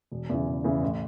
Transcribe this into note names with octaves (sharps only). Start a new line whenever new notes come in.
E1
E2 C#3 E3
E1
E2 C#3 E3
A1